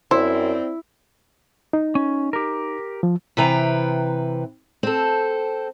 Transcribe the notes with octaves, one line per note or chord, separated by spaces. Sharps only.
F#2 C4 E4 C5 D5
D#4
C#4
G4 A#4
F3
C3 E3 B4 G5 A#5
C4 A4